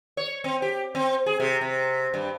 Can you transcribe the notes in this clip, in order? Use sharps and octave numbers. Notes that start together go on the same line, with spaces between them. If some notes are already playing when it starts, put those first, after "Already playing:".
C#5
C4
G4
C4
G#4
C3
C3
G2